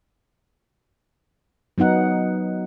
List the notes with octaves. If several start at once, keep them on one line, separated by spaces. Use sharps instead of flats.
F#3 B3 D#4 F#5